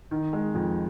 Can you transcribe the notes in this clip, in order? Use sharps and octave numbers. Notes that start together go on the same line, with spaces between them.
D#3
G#3
F2